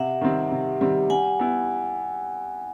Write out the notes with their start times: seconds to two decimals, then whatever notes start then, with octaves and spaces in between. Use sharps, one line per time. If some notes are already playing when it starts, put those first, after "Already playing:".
Already playing: C3 E5 F#5
0.21 D#3 G3 C4
0.51 C3
0.81 D#3 G3 C4
1.10 G3 F#5 G#5
1.40 B3 E4